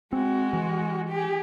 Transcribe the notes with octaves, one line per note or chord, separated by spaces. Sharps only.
G#3 C4 F#4
E3
G4 G#4